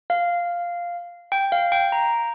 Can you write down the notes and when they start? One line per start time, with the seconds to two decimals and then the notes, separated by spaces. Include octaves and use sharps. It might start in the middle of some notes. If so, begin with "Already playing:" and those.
0.10 F5
1.32 G5
1.52 F5
1.72 G5
1.92 A#5